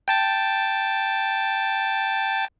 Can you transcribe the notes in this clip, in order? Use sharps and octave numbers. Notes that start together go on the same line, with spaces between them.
G5 A5 A6